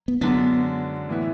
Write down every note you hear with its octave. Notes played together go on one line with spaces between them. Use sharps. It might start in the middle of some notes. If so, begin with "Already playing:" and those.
B3
F#2 D3 G#3 B3 D4 F#4
A2 E3 B3 E4